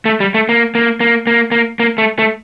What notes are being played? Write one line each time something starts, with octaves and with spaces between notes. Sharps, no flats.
A3
G3
A3
A#3
A#3
A#3
A#3
A#3
A#3
A3
A3